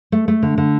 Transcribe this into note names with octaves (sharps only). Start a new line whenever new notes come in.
A3
A3
D3
D3